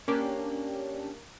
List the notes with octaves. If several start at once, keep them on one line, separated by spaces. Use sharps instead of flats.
A#3 C#4 D4 G4 A#4